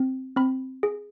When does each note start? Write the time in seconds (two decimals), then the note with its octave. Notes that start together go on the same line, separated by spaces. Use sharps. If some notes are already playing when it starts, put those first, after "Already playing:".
Already playing: C4
0.36 C4 B5
0.83 G#4